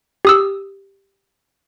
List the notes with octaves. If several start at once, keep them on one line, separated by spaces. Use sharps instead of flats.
G4 D#6 E6